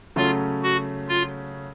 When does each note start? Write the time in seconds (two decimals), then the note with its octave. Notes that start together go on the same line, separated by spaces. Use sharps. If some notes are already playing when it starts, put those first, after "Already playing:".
0.16 C#3 F#3 A3 C#4 F4
0.63 F#4
1.08 F4